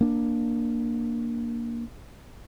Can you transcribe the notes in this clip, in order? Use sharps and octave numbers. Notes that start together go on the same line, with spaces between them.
A#3 D4